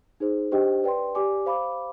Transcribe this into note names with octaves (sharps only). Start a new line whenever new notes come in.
D#4 G#4 C5
D4 G4 C5 D#5 G5
B4 D5 G5 C6
G4 D5 G#5 D6
C5 F5 B5 D6